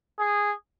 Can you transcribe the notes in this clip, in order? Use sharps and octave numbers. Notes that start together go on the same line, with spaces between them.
G#4